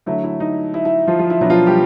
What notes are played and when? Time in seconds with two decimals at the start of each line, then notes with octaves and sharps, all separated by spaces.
0.06 D3 F#3 A3 E4
0.24 E4
0.40 D#4
0.74 E4
0.85 E4
1.07 F3 F4
1.19 F3 F4
1.30 E4
1.41 B2 F#3 B3 D4 E4
1.50 F3 F4
1.67 G3 G4